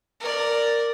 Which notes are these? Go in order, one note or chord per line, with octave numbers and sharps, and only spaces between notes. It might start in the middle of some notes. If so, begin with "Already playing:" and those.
A#4 D5